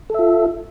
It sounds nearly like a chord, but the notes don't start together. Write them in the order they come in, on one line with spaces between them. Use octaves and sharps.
A4 E5 F4